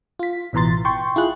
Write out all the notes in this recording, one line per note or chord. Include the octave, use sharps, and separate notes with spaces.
F4 B6
A1 B2 E3 A#5 C6 A6
G5 C6 C#6
E4 F4 G#4 F#6